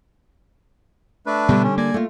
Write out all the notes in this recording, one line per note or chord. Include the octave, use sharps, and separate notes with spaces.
A3 D4 B4
B2 D3 G3 B3
C#4
A#3 D5 G#5
A3 F4